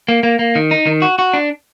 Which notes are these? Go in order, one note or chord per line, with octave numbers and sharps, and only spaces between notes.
A#3
A#3
A#3
D#3
D#4
D#3
F#4
F#4
D4